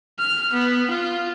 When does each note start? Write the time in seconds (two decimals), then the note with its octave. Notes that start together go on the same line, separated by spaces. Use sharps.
0.19 F6
0.53 B3
0.91 F4